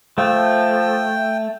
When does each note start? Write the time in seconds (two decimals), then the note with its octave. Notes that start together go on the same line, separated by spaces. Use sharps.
0.18 F3 A3 G5